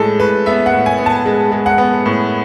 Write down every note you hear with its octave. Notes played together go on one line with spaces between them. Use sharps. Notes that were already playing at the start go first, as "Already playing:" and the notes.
Already playing: A2 G#3 A4
A2 B4
B3 E5
F#5
A2
G#5
B3
A5
G#3
G#3
F#5
B3
A2